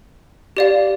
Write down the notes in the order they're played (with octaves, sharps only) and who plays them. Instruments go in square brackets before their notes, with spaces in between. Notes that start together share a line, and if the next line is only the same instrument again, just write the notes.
[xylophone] G4 D5 F5